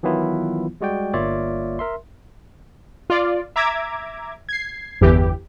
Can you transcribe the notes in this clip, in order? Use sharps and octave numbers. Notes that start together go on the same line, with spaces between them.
D#3 E3 F#3 B3 E4 F4
G3 G#3 F#4 D5 G5
G1 A#3 F4 C#5 D5 E5
A#4 E5 C6
F4 D5
E5 A#5 D6 G#6
G#6 C7
G1 E2 E3 G4